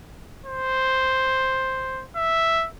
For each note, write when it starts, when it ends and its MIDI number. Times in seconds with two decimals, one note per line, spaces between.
0.46 2.04 72
2.16 2.67 76